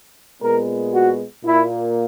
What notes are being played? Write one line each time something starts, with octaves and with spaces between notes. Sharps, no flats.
A#2 G#3 B3 A#4
F#4
A#2 A#3 E4